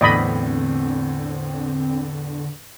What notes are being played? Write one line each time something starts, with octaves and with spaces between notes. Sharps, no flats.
E2 A2 D3 C4 D5 D#5 B5